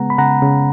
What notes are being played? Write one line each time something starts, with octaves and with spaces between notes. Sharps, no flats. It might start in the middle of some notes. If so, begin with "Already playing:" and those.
Already playing: C#3 G#3 B3 F#5 A#5
B5
C#3 F#5 A#5
C#3